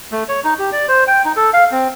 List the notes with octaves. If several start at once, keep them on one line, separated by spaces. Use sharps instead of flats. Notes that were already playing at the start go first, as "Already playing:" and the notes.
A3
C#5
D#4
G4
D5
C5
G5
D#4
A4
F5
C4